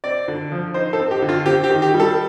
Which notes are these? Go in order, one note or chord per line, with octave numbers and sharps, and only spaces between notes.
C4 D5
D3
F3
D#4 C5
A4
C4
G4
D3
F4
C4 G4
G4
D#3
G4
G3
A4